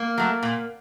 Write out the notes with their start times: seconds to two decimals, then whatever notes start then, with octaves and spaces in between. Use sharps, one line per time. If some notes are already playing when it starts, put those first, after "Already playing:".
Already playing: A#3
0.18 F#3 A3
0.43 A#2